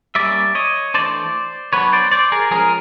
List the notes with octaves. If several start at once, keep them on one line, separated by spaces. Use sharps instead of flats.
G3 A#3 C#4 D5 E5
C#5 D#5
E3 A3 D4 C5 D5
F#3 B3 D4 B4 C#5
C5 D5
C5 D5
G#4 A#4
F3 G#3 C#4 G#4 A#4